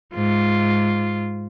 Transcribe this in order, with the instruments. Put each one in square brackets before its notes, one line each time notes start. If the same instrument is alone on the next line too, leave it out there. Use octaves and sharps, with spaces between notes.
[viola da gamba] G#2 F4